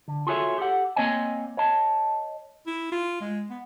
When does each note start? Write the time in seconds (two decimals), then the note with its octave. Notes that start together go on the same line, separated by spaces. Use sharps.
0.08 D3
0.27 F4 F#4 G#4 A4 C#5 E5
0.58 G4 A4 F#5
0.96 A#3 C4 C#5 D#5 G#5
1.57 C#5 D#5 A5
2.66 E4
2.92 F4
3.20 G#3
3.50 B3